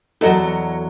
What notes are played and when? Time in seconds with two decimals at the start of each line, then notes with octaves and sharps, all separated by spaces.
0.21 E2 F#3 A4 D#5 F#5